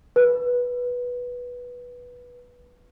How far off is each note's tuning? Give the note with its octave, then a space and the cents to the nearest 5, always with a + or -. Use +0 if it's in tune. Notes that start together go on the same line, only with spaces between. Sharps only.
B4 -10